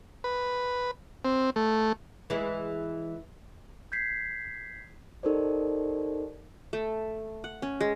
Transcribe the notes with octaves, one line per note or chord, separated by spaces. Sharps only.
B4
C4
A3
E3 G#3 E4
G6 G#6 B6 C7
D#4 G4 A4 A#4 C5 D5
A3
F#5
C#4
G#3